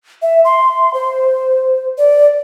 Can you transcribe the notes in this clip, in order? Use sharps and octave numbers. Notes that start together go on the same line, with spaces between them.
E5
C6
C5
D5